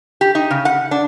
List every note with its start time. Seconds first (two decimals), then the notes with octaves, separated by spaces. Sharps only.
0.21 G4
0.35 D#4
0.51 C#3
0.65 F#5
0.91 D4